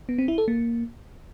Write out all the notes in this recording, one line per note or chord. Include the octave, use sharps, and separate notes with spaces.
B3
C4
E4
A4
A#3